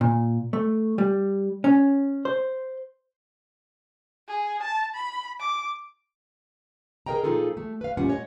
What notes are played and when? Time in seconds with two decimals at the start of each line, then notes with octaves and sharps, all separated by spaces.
0.01 A#2
0.53 A3
0.98 G3
1.64 C#4
2.25 C5
4.28 G#4
4.62 A5
4.95 B5
5.40 D6
7.06 G#4 A#4 C5 D#5 G5 A#5
7.24 A#2 F3 D#4 F4 G#4 A4
7.57 A3
7.81 B4 F5
7.97 A#2 G3 A3 C#4 F4 F#5
8.10 C#5 D#5 F#5